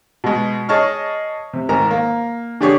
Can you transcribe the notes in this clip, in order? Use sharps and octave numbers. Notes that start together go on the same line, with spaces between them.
B2 G#3
G#4 C#5 D#5 A5 C#6 F6
C3
G#2 D#3 A#4 A#5
A#3
D3 D4 G4 G#4 C#5